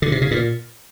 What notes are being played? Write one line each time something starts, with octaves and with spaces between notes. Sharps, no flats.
D3
C3
C#3
A#2